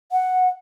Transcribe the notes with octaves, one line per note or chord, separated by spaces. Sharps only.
F#5